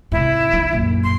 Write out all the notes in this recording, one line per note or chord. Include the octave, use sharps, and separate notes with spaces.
G#2 C3 E4
F3 D#4
A#1 F#2
C6